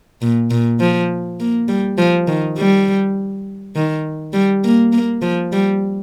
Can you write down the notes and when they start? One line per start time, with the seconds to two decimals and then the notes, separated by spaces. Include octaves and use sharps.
0.22 A#2
0.51 A#2
0.80 F3
1.40 A#3
1.68 G3
1.98 F3
2.27 D#3
2.58 G3
3.76 D#3
4.33 G3
4.64 A#3
4.92 A#3
5.22 F3
5.52 G3